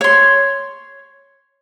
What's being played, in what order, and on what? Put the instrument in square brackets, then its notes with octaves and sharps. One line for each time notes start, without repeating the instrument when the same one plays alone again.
[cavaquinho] C#5 C6